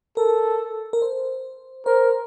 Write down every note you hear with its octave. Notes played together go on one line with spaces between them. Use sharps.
A4 A#4
A#4
C5
A#4 C5